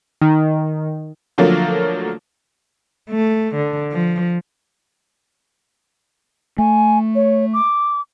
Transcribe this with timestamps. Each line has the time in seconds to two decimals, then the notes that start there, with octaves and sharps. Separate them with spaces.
0.22 D#3
1.38 D3 F3 F#3 A3 A#3
3.10 A3
3.56 D3
3.92 F3
6.58 A3 G#5
7.15 C#5
7.53 D6